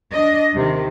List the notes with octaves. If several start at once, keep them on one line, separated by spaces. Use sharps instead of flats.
D4 D#5
D#2 C3 D#3